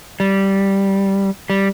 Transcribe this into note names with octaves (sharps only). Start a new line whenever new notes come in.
G3
G3